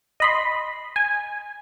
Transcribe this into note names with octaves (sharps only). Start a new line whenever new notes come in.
D#5 B5 C6
G#5